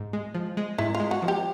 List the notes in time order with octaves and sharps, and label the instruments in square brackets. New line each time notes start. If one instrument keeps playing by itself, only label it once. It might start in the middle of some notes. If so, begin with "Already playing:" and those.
Already playing: [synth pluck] G#2
G#3
F3
G#3
[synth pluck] G#2 [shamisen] E4
[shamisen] F4
[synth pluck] G#3
[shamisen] F#4
[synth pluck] F3
[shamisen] G4